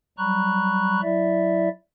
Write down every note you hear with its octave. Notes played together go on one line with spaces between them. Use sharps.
F#3 G3 A#5 B5 C#6 F#6
F#3 E4 D5 E5